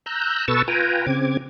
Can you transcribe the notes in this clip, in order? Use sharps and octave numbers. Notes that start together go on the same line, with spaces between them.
A#5 E6 F#6 G6
B2 A4 B4 C#6 E6 A6
F4 B4 G5 G#5 A#5
C#3 C4 D6 G#6